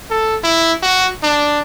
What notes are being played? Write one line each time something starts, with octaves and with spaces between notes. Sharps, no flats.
A4
E4
F#4
D4